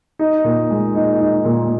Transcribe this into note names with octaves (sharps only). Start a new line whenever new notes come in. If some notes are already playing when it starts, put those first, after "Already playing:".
D#4
A#2
G#3
D#4
D#4
A#2